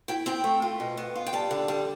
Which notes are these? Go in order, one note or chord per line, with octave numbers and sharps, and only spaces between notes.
E4 G5
C4 G5
A3
F4
B2
B3
F4
G5
G3 A5
D3
G3